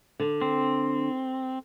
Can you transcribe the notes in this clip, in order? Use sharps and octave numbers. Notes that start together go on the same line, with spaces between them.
D3
C4